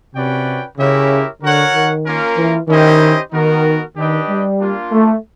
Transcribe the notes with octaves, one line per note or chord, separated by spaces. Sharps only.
C3 C#4 F#4 B4 D5 G5
C#3 E4 G4 A#4 C#5 E5
D3 F#4 A#4 C#5 F#5
D#3
A#3 C#4 F4 A#4
E3
D#3 C#4 E4 G4 C5 D#5
D#3 B3 D#4 F#4 A#4
D#3 D4 G4 B4 D#5 G5
G3
A#3 D4 F4
A3